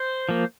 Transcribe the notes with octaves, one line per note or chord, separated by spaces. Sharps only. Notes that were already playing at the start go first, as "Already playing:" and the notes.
Already playing: C5
F3 A#3